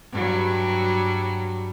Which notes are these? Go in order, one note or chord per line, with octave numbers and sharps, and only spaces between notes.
G2 F#3 G3